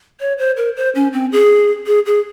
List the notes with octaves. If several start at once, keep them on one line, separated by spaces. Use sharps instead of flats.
C#5
C5
A#4
C5
C#4
C4
G#4
G#4
G#4